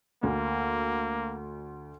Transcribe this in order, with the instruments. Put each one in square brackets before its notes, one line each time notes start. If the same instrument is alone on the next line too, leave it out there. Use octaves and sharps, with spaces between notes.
[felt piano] D2 [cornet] A#3